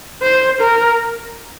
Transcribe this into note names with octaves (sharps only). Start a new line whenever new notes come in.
C5
A#4